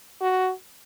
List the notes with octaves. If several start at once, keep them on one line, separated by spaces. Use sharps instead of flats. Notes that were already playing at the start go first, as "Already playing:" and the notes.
F#4